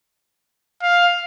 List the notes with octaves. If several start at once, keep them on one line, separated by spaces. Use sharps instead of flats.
F5